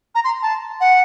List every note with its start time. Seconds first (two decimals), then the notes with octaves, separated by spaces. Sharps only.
0.15 A#5
0.24 C6
0.43 A5
0.80 F#5